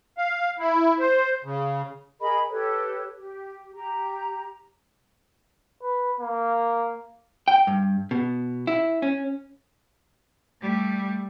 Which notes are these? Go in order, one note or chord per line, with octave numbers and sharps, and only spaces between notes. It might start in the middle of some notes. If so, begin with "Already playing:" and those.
F5
E4
C5
C#3
G#4 A#4 D#5 B5
G4 A4 B4 C#5
G4
G4 A#5
B4
A#3
G5
G2
B2
E4
C#4
G3 A3